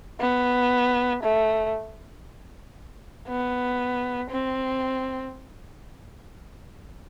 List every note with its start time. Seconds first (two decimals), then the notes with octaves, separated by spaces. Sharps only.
0.20 B3
1.23 A3
3.28 B3
4.30 C4